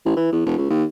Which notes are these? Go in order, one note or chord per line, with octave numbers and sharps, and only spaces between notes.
A1
E3
E2
E1
C#2
D#2